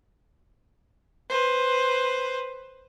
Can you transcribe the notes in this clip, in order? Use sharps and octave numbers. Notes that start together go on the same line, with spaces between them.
B4 C5